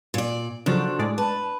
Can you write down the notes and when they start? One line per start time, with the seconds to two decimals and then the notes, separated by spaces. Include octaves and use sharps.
0.14 A#2 D5
0.66 C#3 F3 F#3 D4 F#4 A4 C5
0.99 A2 G#3 D5
1.18 B4 A5